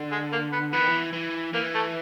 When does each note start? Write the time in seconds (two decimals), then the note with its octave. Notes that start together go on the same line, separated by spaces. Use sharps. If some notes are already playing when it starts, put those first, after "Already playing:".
Already playing: D3
0.11 G#3
0.32 A#3
0.52 B3
0.72 E3 B3
0.80 D#3
0.88 E3
1.13 E3
1.53 E3 A#3
1.74 A3